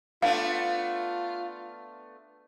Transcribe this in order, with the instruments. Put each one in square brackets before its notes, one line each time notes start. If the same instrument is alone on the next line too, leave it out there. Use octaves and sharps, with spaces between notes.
[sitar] A3 B3 D4 [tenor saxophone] F4 [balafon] F5